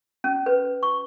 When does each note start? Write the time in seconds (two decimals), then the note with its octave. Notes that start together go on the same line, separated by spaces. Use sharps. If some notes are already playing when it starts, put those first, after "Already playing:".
0.24 C#4
0.46 B4
0.83 C#6